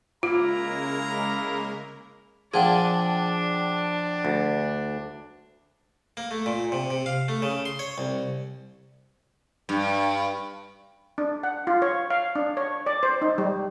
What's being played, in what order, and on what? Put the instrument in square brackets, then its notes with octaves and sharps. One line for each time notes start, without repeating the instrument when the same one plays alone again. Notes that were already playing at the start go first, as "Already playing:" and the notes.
[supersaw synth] C#3 G#3 A#4 [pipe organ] A#3 E4 [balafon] F4 [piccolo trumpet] A#5
[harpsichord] A#2 F3 [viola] D4 [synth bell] G#4 F#5 G5
[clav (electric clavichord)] D2
[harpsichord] A#3
A3
A#2
C3
C3
F5
A3
C#3
C6
C#5
C2
[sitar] G2
[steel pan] D4
F#5
F4
C#5
F5
D4
C#5
D5
C5
D#4
G3